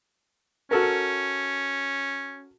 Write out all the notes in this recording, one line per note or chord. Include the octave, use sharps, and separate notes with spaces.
C#4 F#4 A4 A#4